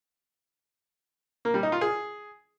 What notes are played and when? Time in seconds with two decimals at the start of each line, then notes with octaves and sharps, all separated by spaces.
1.45 A#3
1.54 G3
1.63 D#4
1.72 F4
1.81 G#4